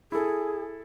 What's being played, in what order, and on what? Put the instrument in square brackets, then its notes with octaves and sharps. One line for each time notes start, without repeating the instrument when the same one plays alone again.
[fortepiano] E4 A4 [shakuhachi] G#4